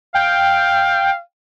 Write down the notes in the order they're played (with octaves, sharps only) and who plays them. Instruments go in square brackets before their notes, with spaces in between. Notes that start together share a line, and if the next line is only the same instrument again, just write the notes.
[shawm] F5 [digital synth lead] G5